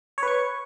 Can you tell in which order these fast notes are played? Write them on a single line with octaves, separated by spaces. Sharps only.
C#5 B4 C#6